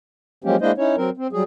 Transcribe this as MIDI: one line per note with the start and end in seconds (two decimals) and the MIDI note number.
0.44 0.56 53
0.44 0.56 54
0.44 0.56 56
0.44 0.56 58
0.44 0.56 61
0.44 0.56 67
0.61 0.72 56
0.61 0.72 58
0.61 0.72 62
0.61 0.72 64
0.61 0.72 72
0.61 0.72 75
0.78 0.96 61
0.78 0.96 63
0.78 0.96 64
0.78 0.96 73
0.97 1.10 54
0.97 1.10 60
0.97 1.10 70
1.17 1.27 60
1.32 1.43 54
1.32 1.43 55
1.32 1.43 68